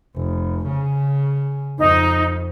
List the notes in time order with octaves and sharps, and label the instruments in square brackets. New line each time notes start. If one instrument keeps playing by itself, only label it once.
[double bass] F1
C#3
[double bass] F2 [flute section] D#4